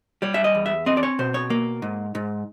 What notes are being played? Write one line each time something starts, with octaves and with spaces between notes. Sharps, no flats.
G3 C#5
E5
D#5
E2
E5
C4 D#5
D5
C#5
B2 C5
C#5
A#3
G#2
G#2